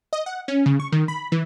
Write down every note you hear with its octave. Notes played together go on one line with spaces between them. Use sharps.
D#5
F#5
C#4
C#3
C#6
D#3
B5
E3